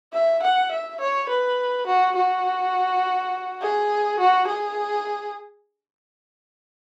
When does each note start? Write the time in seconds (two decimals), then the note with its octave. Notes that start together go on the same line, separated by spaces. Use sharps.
0.13 E5
0.42 F#5
0.71 E5
1.00 C#5
1.29 B4
1.86 F#4
2.16 F#4
3.61 G#4
4.19 F#4
4.47 G#4